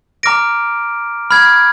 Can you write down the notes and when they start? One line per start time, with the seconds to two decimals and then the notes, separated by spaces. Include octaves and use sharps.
0.23 A#5 D6 F6 A#6 D7
1.30 B5 F6 G#6